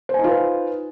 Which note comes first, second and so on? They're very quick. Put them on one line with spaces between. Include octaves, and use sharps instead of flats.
C5 G#5 D#4 F4 B4